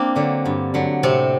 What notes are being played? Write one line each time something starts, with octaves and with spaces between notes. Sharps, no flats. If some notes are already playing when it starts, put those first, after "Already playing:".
Already playing: A#3 C4 D4
D3 F#3
G2
D3 F#3
A2 C3 C4